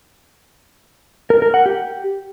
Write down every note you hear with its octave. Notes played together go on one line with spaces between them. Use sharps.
A#4
A#4
F#5
G4